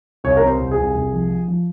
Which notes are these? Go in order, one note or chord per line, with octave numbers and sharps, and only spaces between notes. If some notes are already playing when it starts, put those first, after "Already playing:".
C2 C#5
C3 A#4
C5
C2
G#4
C2
C2
F3
F3
F3